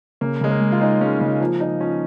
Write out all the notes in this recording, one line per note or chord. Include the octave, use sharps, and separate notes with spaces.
C#3 A#3
C#3 G#3
A#3
G#3
F4
G#3 D#4
G#3 C#4
C#3 C#4
F3 A#3
F3 D#4
F3 C#4